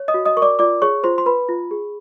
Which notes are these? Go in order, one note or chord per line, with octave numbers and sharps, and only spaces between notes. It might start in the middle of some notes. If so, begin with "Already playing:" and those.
Already playing: C#5
D#5 D#6
F#4
D#5 D#6
A#4 C#6
D5 D6
F4 D5 D6
G#4 C#5 C#6
F4 C5 C6
C6
B4 B5
F4
G#4